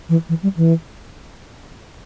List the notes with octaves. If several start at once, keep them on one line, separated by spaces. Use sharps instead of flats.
E3
E3
G3
E3